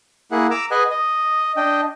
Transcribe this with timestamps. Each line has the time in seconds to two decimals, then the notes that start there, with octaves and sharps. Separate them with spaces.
0.32 A#3 E4 G#4 F#5
0.51 A#5 D6 E6
0.71 G#4 B4 D#5 F#5 G#5
0.90 D#5
1.57 D4 D#5 G5